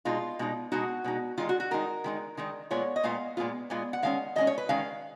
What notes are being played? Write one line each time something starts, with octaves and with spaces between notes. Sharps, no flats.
B2 G#3 D#4 F4
B2 G#3 D#4
B2 G#3 D#4 F#4
B2 G#3 D#4
D#3 G#3 D#4 F4
F#4
F#4
D#3 G#3 D#4 A#4
D#3 G#3 D#4
D#3 G#3 D#4
A#2 G#3 B3 F4 C#5
D#5
A#2 G#3 B3 F4 F5
A#2 G#3 B3 F4
A#2 G#3 B3 F4
F#5
D#3 G#3 C#4 F5
D#3 G#3 C#4 D#5
C#5
B4
D#3 G#3 C#4 F5